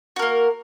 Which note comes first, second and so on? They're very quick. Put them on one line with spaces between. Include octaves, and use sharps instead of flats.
F#4 A#4 A#3